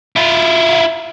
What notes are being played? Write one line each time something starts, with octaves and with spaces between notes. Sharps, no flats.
E4 F4